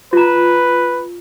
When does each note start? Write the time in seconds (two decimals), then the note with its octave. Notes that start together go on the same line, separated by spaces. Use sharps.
0.13 F4 B4 A#5